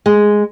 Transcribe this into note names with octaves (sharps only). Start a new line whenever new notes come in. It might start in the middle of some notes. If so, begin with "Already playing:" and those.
G#3